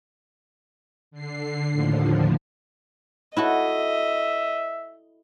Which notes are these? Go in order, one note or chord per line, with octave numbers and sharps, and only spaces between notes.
D3 C7
D#2 A2 D3 F3
E4 F#4 A4 D#5 E5